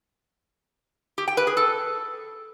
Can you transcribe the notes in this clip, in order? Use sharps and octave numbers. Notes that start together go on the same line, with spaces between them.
G4
G5
B4
G#4
A4